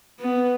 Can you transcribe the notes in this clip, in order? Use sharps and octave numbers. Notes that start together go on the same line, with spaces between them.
B3